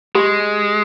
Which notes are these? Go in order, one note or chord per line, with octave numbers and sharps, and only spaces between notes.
G#3 G4